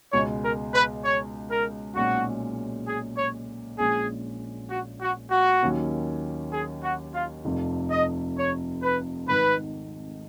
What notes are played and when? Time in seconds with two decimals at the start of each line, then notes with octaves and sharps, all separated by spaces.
0.12 C#2 B2 G#3 C#5
0.43 A#4
0.74 B4
1.04 C#5
1.51 A#4
1.96 B1 A#2 G#3 C#4 F#4
2.87 G#4
3.17 C#5
3.79 A#1 A#2 G#3 C#4 G#4
4.71 F#4
5.01 F#4
5.31 F#4
5.62 D#2 D#3 F#3 A#3 C#4
6.53 G#4
6.83 F#4
7.14 F4
7.45 F1 F2 F3
7.91 D#5
8.37 C#5
8.82 B4
9.28 G#1 G#2 D#3 B4